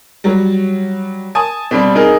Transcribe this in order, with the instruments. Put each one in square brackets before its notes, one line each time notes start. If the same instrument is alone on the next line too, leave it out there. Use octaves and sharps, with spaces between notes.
[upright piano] F#3 G3
G#5 A5 D#6
[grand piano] B2 G3 [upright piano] C4
[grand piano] D#4 G#4 A#4